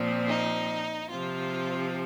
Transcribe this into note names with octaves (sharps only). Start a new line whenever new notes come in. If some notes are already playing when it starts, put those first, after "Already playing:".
Already playing: A#2 F3 C4
D#4
C3 F3 C4 F4